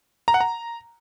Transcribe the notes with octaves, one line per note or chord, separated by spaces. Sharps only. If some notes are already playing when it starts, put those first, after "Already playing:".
A#5
F#5
A#5